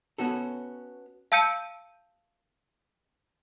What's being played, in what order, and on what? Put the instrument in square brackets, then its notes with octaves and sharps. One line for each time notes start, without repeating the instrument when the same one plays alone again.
[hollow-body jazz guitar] B3 C#4 F#4 A4
[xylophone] F5 A5 E6 G6 C#7 D#7